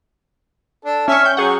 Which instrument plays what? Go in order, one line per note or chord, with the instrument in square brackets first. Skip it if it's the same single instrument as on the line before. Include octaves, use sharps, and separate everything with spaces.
[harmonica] D4 A4
[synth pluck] C#4 C#6 [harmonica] E5 G#5 F6
[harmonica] G5 [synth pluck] G6
[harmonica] F#3 C#6 [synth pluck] G#4 F#5